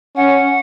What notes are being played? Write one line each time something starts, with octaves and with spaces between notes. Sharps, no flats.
C#4 F#5